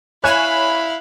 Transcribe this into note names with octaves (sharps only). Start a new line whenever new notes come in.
E4 C#5 F5 G#5 B5 F#6 E7